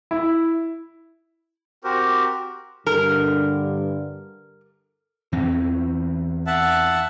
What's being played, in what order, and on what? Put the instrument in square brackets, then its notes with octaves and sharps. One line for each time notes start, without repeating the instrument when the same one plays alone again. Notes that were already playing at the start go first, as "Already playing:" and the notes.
[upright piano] E4
[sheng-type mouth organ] C4 F#4 G4 A#4 C5
[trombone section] G2 D3 [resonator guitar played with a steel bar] A#4
[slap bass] E2 E3 C4
[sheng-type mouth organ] E5 F#5 A5